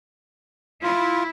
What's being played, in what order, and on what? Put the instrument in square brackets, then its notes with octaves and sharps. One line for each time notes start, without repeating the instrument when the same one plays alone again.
[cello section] E4 [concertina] F4